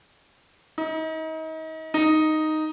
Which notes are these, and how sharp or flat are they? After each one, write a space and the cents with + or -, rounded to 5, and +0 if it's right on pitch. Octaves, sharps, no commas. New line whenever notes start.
D#4 +35
D#4 +0